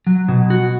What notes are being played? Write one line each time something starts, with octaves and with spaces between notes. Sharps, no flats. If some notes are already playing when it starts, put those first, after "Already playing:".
F#3
B2
F#4